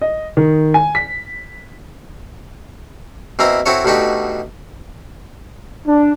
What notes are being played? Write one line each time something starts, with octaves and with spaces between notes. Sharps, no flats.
D#5
D#3
G#5
B6
B2 A#3 C4 E4 A#5
C4 E4 F#4 A4 C#5
D2 B2 D3 D#4 F#4 G4
D4